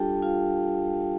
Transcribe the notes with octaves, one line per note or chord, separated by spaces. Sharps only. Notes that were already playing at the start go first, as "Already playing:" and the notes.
Already playing: G3 D4 F4 G4 A4 G5 A5
F4 F5